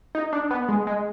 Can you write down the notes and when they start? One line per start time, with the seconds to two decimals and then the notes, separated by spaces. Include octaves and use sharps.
0.15 D#4
0.33 D4
0.51 B3
0.68 G#3
0.87 G#3